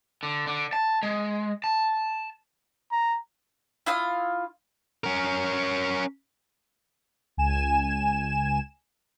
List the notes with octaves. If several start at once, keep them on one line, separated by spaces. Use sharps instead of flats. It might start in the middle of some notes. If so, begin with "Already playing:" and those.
D3
D3
A5
G#3
A5
A#5
E4 F4 F5 D#6
C#4 A#4
C#2 G#5 E7